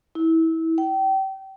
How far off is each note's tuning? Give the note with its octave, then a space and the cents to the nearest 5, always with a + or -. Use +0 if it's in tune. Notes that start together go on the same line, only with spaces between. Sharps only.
E4 -25
G5 -30